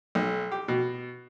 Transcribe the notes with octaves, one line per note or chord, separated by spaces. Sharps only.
B1
G4
B2